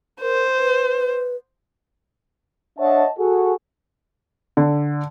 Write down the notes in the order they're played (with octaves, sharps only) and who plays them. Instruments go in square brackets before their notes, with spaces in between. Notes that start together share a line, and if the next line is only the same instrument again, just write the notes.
[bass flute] A#4 [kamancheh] C5
[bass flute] B4
[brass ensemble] D4 C#5 D#5 E5 F#5 A5
F#4 G#4 A4
[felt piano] D3